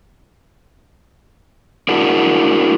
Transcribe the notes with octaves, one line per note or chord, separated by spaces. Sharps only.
D4 E4 F#4 G#4 A#4